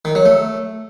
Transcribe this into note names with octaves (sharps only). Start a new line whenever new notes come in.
D#3
F#3
A3